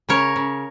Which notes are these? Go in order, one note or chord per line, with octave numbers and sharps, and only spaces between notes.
C#3 A#4 C#5
C#3